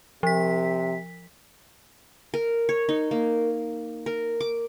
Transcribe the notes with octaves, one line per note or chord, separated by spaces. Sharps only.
C3 F3 B6
A#4
C#5
D#4
A#3
A#4
D6